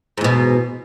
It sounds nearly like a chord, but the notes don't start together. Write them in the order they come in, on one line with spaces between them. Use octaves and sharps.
G#2 E2 B2